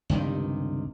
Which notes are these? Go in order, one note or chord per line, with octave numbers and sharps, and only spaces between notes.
C#2 G2 C3 D#3